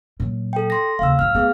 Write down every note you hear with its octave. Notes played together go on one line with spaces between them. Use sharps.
A#2 F#3
A4 G5
C6 A#6
D#2 C#3 F5 E6
G#2 F#3 F6
A3 B3 G#4 F5